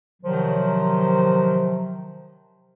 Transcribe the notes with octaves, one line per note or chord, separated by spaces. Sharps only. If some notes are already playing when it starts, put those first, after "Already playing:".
C3 D#3 F3 F#3